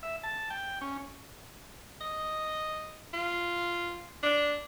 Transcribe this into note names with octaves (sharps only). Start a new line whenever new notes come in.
E5
A5
G5
C#4
D#5
F4
D4